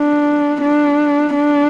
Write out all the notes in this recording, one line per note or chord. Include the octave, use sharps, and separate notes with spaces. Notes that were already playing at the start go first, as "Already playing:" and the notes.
Already playing: D4
D4
D4